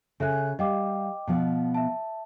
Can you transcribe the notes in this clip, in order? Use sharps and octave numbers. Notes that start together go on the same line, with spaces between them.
C#3 A4 E5 G#5 F#6
G3 D#5 F5 G5 D6
B2 F3 B3
E5 A5